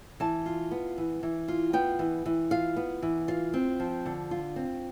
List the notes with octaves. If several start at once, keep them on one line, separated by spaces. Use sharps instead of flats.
E3 A5
F4
B3
E3
E3
F4
B3 G5
E3
E3
F4 F5
B3
E3
F4 F5
C4
F3
D3
F4
C4